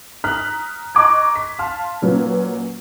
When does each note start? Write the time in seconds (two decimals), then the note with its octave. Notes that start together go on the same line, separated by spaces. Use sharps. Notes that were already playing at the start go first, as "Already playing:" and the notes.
0.24 A#5 D#6 F6 F#6 B6
0.95 D#5 A#5 C#6 D6 F#6 G#6
1.36 B6
1.59 F5 A5 C6 F6
2.02 A#2 F#3 C#4 F4 B4